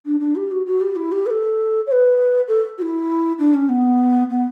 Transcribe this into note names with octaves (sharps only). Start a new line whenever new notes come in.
D4
D4
G4
F#4
F#4
G4
E4
G4
B4
A4
C#5
B4
A4
F#4
E4
D4
C#4
B3
B3